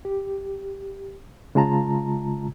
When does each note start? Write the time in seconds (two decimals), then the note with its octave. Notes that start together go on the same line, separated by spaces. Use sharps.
0.05 G4
1.55 C#3 G#3 F4 A5 A#5